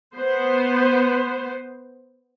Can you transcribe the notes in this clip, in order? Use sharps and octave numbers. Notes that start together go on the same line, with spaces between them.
B3 C5